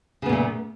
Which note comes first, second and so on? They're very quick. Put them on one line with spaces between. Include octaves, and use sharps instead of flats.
C#3 B3 A#2 A3